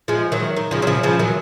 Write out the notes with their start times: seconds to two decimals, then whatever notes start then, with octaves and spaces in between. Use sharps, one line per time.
0.08 F3 G#3
0.32 D#3 F#3
0.57 D#3
0.71 C#3 F3
0.82 F#3
0.87 C#3 F3
1.03 C#3 F3
1.19 D#3 F#3